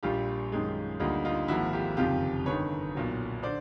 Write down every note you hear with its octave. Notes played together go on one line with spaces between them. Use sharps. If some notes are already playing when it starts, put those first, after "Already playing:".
A#1 A#2 G3 F4 G4
F#2 D#3 G#3
D2 D3 G3 A#3 D#4 F4
D#4 F4
G#1 G#2 F3 A#3 E4 F#4
F4 G4
F#1 F2 C3 D#3 F4 G4
G1 G2 D#3 B4 C#5
B1 A#2 F#3
D3 C5 D5